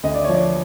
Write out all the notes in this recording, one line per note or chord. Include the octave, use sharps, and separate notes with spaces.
D2 D#5
D5
F3 C#5
D5